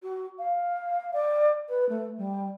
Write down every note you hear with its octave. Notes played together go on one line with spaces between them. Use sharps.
F#4
F5
D5
B4
A3
G3